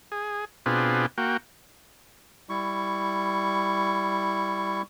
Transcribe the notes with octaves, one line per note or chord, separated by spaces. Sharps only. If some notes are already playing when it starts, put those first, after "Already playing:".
G#4
B2 C4 D4 F4 G#4 B4
A#3 F#4 G5
G3 E4 C#6